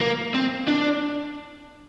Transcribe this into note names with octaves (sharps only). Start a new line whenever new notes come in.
A#3
C4
D4